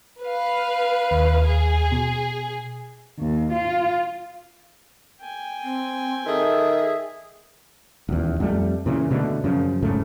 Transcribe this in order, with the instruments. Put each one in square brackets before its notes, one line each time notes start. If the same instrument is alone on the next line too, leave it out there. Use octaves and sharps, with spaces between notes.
[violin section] B4 F5
[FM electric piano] D#2
[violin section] G#4
[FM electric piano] B2
[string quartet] D#2
F4
[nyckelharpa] G5 G#5
[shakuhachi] C4
[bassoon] D#3 [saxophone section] G#4 E5 [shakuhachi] A4
[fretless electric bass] D#1 E2
F2 G3 A3
A#2 C#3 E3
B2 D3 A3
F#2 C#3 F3
E1 G#2 C#3 A3